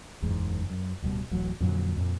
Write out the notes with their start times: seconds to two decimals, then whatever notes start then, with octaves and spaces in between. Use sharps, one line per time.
0.22 F#1 E2 G#2
0.70 F#2
1.02 D1 B2 G3
1.31 D1 A1 F#3
1.60 F2 A#2 D3 F#3
1.96 F2 A#2